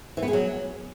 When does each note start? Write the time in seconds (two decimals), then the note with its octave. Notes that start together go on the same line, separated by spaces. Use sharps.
0.17 E3
0.22 B3
0.28 G#4
0.33 F#3